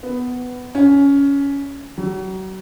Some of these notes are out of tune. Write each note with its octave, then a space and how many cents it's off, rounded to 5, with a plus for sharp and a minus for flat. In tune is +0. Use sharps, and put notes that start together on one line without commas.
B3 +10
C#4 +15
F#3 +35